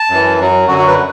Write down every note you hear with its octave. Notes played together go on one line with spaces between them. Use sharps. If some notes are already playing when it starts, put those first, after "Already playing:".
Already playing: A5
F#2 E3
F#2 F#3
F#2 D3 F#3 F#4
F#4
B4